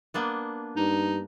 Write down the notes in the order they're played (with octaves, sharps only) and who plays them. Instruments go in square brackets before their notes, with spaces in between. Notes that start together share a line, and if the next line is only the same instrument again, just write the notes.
[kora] A#3 B3 D4
[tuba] G2 [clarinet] D#4